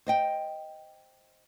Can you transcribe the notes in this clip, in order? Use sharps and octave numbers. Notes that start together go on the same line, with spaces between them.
C5 D#5 G5